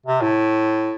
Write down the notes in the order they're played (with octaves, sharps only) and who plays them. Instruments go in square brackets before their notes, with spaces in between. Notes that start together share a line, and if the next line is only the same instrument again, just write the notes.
[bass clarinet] C3
A2